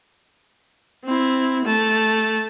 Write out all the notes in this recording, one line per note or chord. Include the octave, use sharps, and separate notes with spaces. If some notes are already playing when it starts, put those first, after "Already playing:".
C4 E4
A3 A5